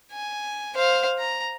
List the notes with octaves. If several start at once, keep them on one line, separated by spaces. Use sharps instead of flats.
G#5
C5 F5
A#5